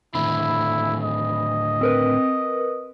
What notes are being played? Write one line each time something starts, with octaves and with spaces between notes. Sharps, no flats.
A2 D3 D#3 E4 B5
D#5
C4 A#4 B4